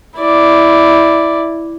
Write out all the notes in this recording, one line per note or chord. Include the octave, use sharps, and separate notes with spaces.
E4 D5